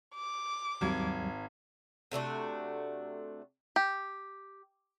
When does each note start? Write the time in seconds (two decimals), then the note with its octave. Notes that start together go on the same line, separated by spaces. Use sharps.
0.15 D6
0.81 G#1 D#2 F#3 G3 G#6
2.11 C3 A3 D4 F#4
3.76 G4